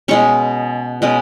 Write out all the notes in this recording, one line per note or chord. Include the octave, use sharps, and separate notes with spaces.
B2 G#3 C#4 C#5 C#6
B2 G#3 C#4